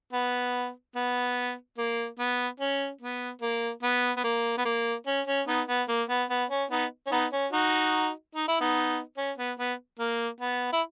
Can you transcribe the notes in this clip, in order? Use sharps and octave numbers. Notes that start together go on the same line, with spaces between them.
B3
B3
A#3
B3
C#4
B3
A#3
B3
B3
A#3
B3
A#3
C#4
C#4
B3 D#4
B3
A#3
B3
B3
C#4
B3 D#4
C#4
B3 D#4
C#4
D#4 F#4
D#4
E4
B3 D#4
C#4
B3
B3
A#3
B3
E4